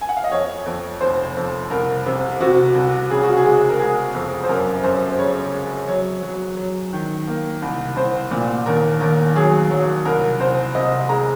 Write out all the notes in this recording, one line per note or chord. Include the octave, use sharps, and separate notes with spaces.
G#5
F#5
F5
D#5
F2 C#5
F2
F1 C5
F2
C2 A#4
C3
C3 F#4
C2
C#3 G#4
F#4
G#4
G#3
A#4
G#3 G#4
F2
C5
F#2 A#4
A#4
F#2 C5
C5
C#3 C#5
G#3
F#3 C#5
F#3
F#3
D#3
A#3
C2
C2 C5
A#2
D#2 A#4
D#2 A#4
F#3 G#4
F#3
C2 A#4
C2 C5
C3 D#5
G#3 A#5